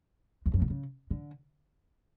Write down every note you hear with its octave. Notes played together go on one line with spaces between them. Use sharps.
E2
F#2
B2
C#3
D3